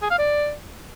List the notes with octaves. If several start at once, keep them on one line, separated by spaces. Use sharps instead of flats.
G#4
F5
D5